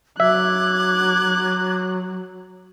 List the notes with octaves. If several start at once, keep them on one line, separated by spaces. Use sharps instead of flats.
F#3 E5 D6 F#6 G#6